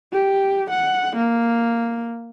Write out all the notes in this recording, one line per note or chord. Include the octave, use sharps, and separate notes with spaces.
G4
F#5
A#3